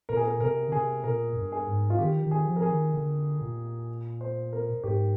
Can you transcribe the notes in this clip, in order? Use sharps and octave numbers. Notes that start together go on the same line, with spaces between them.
A#2 A#4
G#4
A#4
C3 A#4
D3
C3 G#4
A#2 A#4
G2
G#4
G#2
F4
D#3 G4
D#3
G#4
F3
A#4
G#4
D#3
D3
A#2
C5
A#4
G#2 G4